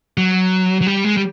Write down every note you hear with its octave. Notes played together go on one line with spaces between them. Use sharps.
F#3
F#3
G3
G#3
G3